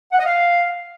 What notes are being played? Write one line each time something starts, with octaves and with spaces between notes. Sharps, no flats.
F#5
D#5
F5